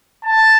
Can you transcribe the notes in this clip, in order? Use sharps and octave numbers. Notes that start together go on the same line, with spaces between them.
A5